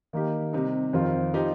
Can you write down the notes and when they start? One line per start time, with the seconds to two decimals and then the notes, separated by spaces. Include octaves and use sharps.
0.13 D#3 A#3 D#4 G4
0.53 C3 G3 D#4
0.93 F2 D#3 C4 F4
1.34 F3 C4 D#4 G4